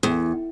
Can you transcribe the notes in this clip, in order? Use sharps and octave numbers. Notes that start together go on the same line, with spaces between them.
E2